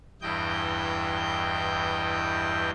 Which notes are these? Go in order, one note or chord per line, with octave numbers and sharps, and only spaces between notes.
E2 G2 E3 D#5 G5 G6